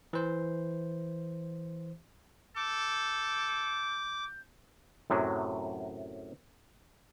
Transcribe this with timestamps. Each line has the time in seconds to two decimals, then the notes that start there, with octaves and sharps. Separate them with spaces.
0.13 E3 C5
2.57 A4 D6 G6
5.10 F#2 A2 C3 F#3